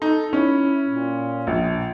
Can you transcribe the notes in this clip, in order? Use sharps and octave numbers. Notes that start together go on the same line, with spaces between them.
D#4 A4
C#4 E4
A#2
A#1